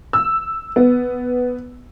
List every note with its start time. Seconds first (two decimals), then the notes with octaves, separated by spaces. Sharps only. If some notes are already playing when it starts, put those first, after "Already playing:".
0.13 E6
0.76 B3